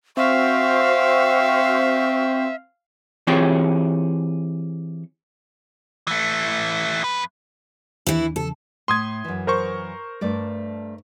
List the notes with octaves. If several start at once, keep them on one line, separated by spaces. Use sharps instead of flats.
C4 F#4 C5 E5 F5 C#6
E3 C4 F4 G4 G#4 C#5
E3 A3
F2 B4
D#2 E3 D4 E4
E2 C#3 F3 A4
A2 C6 D#6 G#6
F#2 E3
A#4 C5 C#6
G2 A3 D5